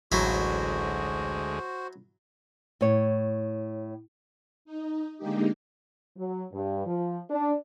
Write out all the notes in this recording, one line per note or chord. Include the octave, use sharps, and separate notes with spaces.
A1 D2 F#3 G#3 E4 F#4 C5
A2 C#5
D#4
D3 G#3 A#3 D#4 G4
F#3
G2
F3
D4